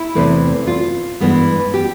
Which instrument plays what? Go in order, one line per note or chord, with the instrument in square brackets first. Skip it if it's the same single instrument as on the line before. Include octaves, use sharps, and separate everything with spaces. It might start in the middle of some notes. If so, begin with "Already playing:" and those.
Already playing: [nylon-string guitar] E4
E2 C3 E3 A3
F4
G2 E3 G#3 B3
G4